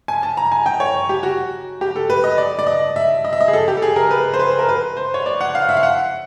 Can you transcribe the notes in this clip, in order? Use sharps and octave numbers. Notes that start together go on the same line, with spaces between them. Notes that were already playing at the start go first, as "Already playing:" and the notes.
G#5
A5
A#5
G#5
G5
C#5
G4
F#4
G4
A4
B4
D#5
D5
D5
D#5
E5
D#5
E5
D#5
G#4
A4
G4
A4
G#4
A#4
B4
C5
B4
A#4
B4
C5
C#5
D5
F#5
F5
E5
F5
F#5